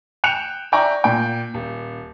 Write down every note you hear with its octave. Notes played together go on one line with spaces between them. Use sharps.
G5 F#6 C#7 E7 F7
D5 E5 G5 A#5 C#6 D6
A#2 G5
D#1